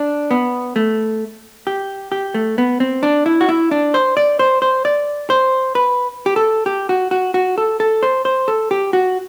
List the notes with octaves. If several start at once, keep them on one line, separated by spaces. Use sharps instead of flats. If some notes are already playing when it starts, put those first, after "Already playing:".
Already playing: D4
B3
A3
G4
G4
A3
B3
C4
D4
E4
F#4
E4
D4
C5
D5
C5
C5
D5
C5
B4
G4
A4
G4
F#4
F#4
F#4
A4
A4
C5
C5
A4
G4
F#4